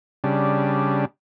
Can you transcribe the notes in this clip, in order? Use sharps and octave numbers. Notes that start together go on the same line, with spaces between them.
C#3 G3 D4